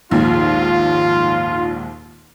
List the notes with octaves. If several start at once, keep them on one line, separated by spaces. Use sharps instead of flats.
A#1 D#2 G#2 F4